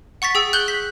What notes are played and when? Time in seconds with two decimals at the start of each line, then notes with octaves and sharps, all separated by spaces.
0.22 F#5 C#6 A6 B6
0.35 G#4 G5 E6
0.53 F#6 G6 F#7 G7
0.68 B6